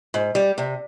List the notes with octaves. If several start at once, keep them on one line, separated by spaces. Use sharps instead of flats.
G#2
G3
C3